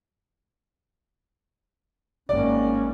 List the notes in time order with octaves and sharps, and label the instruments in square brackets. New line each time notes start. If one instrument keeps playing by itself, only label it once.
[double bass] G#1 A#3 [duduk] C#4 [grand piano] D5